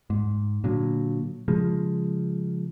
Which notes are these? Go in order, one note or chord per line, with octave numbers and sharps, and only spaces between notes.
G#2
A#2 D3 F#3
C#3 F3 G#3